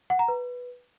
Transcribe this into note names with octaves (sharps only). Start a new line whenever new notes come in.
F#5
A#5
B4